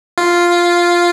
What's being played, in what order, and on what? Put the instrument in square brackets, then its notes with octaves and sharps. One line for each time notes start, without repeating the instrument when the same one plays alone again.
[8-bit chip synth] F4